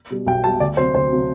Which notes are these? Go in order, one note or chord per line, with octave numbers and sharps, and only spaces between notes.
B2 G3
B1 G5
B2 G3 A5
D2 D5
C3 F#3 C5
D2 C5
C3 F#3